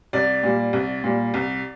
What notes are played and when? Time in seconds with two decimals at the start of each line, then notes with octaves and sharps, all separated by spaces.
0.13 C2 D5
0.43 A#2 G3
0.73 C2
1.04 A#2 G3
1.34 C2